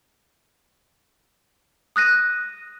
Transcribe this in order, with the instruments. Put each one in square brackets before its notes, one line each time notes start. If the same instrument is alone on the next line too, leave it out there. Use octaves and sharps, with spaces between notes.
[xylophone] D#6 F#6 A#6 D#7